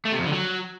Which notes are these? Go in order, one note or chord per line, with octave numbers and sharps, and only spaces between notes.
A3
C3
F2
D3
F#3